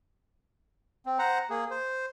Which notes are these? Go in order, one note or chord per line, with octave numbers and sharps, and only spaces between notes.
C4
C5 F#5 A#5
A#3 G#4
C5